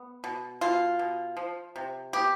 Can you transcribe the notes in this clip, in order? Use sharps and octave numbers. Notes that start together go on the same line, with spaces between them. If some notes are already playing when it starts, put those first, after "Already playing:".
Already playing: B3
B2
B2 F4
B2
F3
C3
B3 G4